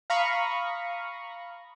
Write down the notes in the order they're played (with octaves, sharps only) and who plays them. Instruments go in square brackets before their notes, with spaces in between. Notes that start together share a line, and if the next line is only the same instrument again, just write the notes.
[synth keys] F5 A#5 B5 C#6 D#6